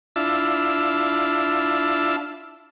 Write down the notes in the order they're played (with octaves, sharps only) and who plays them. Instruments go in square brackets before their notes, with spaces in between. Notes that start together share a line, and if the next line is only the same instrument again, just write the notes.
[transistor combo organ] D4 E4 F4 E5 A5